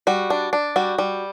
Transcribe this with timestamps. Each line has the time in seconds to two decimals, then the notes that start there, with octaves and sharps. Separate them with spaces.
0.07 G3 F#4
0.30 D4
0.53 D4
0.76 G3 F#4
0.99 G3